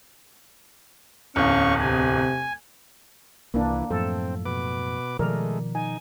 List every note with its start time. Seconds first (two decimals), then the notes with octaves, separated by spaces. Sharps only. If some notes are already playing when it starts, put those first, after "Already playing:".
1.36 D1 E2 C#4 F5 C#6
1.81 C3 G#5
3.54 C2 E3 A#3 D4
3.90 F#2 A2 F3 C4 A4
4.46 B2 B4 D6
5.19 B2 D#3 F3 G#3 A3 A#4 D5
5.75 D#4 G#5